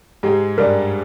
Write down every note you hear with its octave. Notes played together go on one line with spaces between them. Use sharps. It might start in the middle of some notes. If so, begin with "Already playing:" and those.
G#2 G#3 G4
G2 G3 A#4 D5